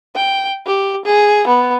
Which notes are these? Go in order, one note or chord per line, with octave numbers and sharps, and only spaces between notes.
G5
G4
G#4
B3